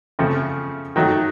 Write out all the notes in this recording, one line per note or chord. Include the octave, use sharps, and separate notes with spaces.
C#3 F3 A3 C4
D#3 F#3 A3